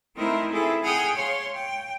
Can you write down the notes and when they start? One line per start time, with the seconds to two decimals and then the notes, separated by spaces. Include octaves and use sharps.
0.15 A3 C4 D#4 E4 A#4 C5
0.51 C4 E4 G#4 A4
0.82 G#4 F#5 G5 D#6 F6
1.14 C#5 F5 C6
1.53 G5